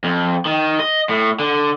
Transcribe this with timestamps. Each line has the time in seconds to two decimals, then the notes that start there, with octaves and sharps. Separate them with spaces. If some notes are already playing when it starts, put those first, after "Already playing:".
0.04 F2
0.45 D#3
0.80 D#5
1.09 A2
1.39 D3